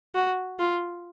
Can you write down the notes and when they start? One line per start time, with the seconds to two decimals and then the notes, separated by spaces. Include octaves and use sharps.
0.15 F#4
0.59 F4